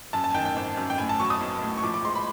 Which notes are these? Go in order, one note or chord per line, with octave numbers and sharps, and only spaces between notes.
F#2 A5
A5
G#5
D#3 G5
G5
G#1
F#2
G5
A2 G#5
A5
F#3 C#6
D#6
B1
A2
C#6
F3 D6
D6
G#3 C6
B5